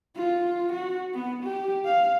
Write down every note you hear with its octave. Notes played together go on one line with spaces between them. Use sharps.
F4
F#4
B3
G4
F5